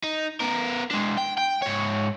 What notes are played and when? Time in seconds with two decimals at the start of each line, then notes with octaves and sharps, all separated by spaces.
0.04 D#4
0.40 B3 A#4
0.91 G#3 D4
1.18 G5
1.38 G5
1.62 G#2 C#5